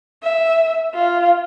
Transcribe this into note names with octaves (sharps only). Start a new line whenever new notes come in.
E5
F4